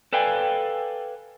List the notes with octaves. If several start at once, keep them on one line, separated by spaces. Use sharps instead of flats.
A4 B4 D5 F5 G5 G#5